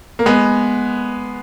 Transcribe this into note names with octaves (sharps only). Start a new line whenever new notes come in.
A#3
G#3 B3